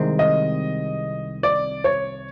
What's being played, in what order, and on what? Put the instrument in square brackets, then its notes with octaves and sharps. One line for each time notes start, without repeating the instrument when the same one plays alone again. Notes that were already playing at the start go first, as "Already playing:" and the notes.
Already playing: [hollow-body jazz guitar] C2 C3 D#3 G#3 C4
[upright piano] D#5
D5
C#5